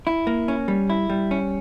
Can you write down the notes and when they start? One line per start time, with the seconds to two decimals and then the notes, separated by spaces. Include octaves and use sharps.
0.07 E4
0.27 A#3
0.48 C#4
0.68 G3
0.90 E4
1.10 G3
1.31 C#4